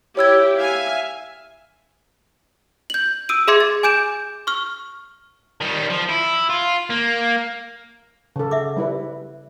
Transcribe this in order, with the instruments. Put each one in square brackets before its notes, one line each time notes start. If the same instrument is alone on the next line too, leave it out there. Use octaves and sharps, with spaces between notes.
[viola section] E4 G4 [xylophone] C#5 E6 G#6
[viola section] E5 F5 G#5
[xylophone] G6 F#7
D#6 E6 D7 D#7
G#4 E5 C6 D6 G#6 C#7
A6
G#5 D6 G6 D7 E7
C#6 F6
[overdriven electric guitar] D#3 G3
F3
E4
F4
A#3
[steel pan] C#3 A4
[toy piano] E5 F#5 D6
[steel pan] G3 E4 B4